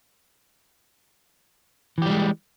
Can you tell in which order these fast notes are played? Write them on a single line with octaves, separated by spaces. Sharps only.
E3 G4 G3 G#3